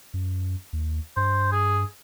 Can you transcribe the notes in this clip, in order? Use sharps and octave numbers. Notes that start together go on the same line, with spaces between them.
F#2
D#2
G2 C5
G#4